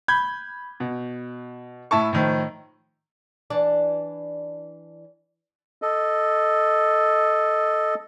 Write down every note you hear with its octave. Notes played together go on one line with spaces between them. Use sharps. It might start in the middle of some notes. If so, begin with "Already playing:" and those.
B5 G6 G#6
B2
A2 E4 A5 C#6
A2 D#3 F3
E3 D4 D5
A4 D#5